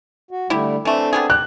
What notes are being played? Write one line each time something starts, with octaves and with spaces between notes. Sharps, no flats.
F#4
D3 G3 A3 E4 G4
E3 A3 C4 D4 A4
B3 G4 G#4
G4 F#6